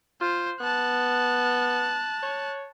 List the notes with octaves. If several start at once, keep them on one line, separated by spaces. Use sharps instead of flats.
F4 C5
B3 A5 F#6
C#5